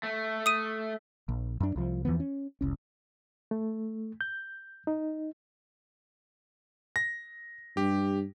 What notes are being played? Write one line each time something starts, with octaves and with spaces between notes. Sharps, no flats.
A3
D#6 D#7
A#1
F#2 D4
C2 F3
E2 E3 F3 B3
C#4
F1 C2 C#4
A3
G6
D#4
A#6
G2 G4